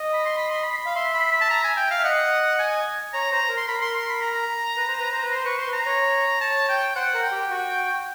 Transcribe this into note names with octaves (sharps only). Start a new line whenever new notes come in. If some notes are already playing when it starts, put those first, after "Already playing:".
Already playing: D#5
B5
C6
B5
C6
B5
F5
E5 C6
B5
B5
A5
A#5
G#5
G5
F5
E5
D#5 F#5
G#5
C#5 A#5
C5 A#5
A#4
C6
A#4 B5
C6
C6
B5
A#5
B4
C5
B4
C5
B4
C5 C6
B4 C#6
C5 C6
B4
A#5
C#5
C#5 A5
G5
C5 F#5
A#4
G5
G4
F#4